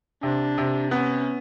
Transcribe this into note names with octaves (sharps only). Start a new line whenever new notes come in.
C3 D4
C3
B3 C#4